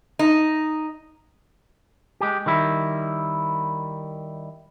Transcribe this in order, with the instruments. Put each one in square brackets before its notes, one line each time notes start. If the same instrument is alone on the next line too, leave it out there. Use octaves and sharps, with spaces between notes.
[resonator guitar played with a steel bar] D#4
[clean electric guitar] G#3 G4
D#3 G3 E4